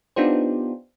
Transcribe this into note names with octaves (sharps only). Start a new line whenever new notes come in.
B3 D4 D#4 F4 G4 C5